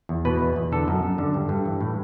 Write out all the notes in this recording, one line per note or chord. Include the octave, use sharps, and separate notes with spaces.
E2
B2 B4
E2
E2
D3 A4
F#2
F#2
D3
G2
G2
E3
A2